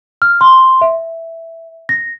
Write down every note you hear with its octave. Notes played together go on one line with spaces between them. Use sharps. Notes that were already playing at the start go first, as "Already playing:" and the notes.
F6
C6
E5
A#6